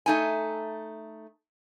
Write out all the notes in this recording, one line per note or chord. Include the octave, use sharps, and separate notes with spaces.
A3 D#4 G#5